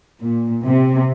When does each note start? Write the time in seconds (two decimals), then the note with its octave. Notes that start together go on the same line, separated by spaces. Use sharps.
0.22 A#2
0.65 C3